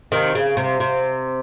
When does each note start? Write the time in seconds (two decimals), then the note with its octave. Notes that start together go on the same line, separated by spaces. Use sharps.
0.12 C3 D#3
0.35 C#3
0.57 C3
0.80 C3